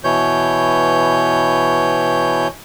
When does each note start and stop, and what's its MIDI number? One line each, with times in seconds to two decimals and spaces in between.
0.04 2.48 47
0.04 2.48 52
0.04 2.48 73
0.04 2.48 91